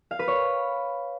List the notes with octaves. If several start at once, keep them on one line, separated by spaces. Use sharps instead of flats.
F5
B4
C#5